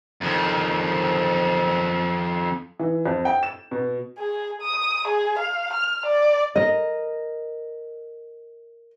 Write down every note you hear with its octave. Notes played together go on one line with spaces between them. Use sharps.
F2 D#3
E3
F2
G5
E7
B2
G#4
D#6
G#4
F5
F6
D5
A#4 D#5